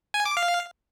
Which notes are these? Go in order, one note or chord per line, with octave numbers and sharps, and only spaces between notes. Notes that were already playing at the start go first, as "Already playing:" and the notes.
G#5
D6
F5